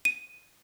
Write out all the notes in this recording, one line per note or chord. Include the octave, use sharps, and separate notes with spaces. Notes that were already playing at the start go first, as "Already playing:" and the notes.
D#7